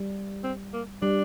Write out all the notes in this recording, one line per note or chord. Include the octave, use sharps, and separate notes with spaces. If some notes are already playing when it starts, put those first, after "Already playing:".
Already playing: G3
C4
A#3
G3 D4